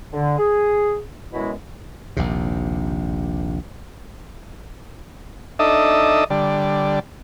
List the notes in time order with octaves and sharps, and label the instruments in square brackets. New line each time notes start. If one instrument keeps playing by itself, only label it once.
[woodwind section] D3
G#4
F#2 B2 G#3 B3 E4 F#4
[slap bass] A#1 D#2 C3
[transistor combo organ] D4 D#4 A4 D#5 E5
D3 G3